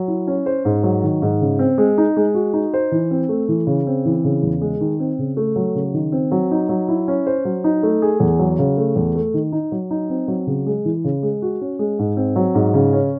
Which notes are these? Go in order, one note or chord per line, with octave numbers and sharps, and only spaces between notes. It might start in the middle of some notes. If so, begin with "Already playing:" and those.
Already playing: F#3
E4
C#4
C5
G#2
F#3
D#3
G#2
C#3
C4
G#3
D#4
G#3
F#4
D#4
C5
E3
C4
A3
E3
C#3
C4
E3
C#3
E2
G#3
D#3
C4
C#3
A3
F#3
C#3
D#3
C4
F#3
D#4
F#3
E4
C#4
C5
F#3
D#4
A3
G#4
E2
F#3
C#3
A3
E2
A3
D#3
D#4
F#3
D#4
C4
F#3
C#3
G#3
E3
C#3
G#3
F#4
C#4
G#3
G#2
C4
F#3
G#2
C#3
C#4